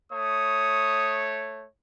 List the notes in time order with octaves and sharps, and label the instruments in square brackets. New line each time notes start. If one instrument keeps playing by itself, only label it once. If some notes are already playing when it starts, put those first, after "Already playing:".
[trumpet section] A3 C#5 [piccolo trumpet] D#6